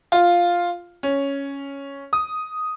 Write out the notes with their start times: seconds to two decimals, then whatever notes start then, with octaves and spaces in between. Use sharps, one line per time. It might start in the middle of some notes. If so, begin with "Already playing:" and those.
0.12 F4
1.03 C#4
2.13 D#6